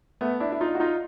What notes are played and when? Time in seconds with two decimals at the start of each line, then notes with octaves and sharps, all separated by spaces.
0.21 A3 B3
0.40 D4 E4
0.52 E4
0.61 D#4 F4
0.75 F#4
0.80 D#4 F4